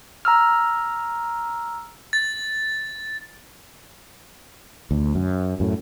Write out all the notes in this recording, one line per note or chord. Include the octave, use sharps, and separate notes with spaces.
A#5 E6 F6
A6
D2
F#2
F#2 A2